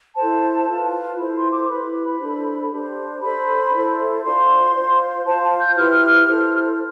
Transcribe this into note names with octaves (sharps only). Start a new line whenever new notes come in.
E4 A4 C5 A5
F4 B4
E4 A4 C5 B5
C6
D6
E4 G4 B4 B5
D4 A4 C5
D4 G4 C5
D4 A4 C5 B5
E4 A4 C5
D4 F4 C5 C6
F4 C5
F4 C5 A5
A5
G6
E4 G4 B4 F6
E4 A4 C5